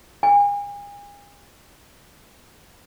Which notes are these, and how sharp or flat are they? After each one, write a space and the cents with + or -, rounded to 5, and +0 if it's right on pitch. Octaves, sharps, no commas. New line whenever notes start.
G#5 -40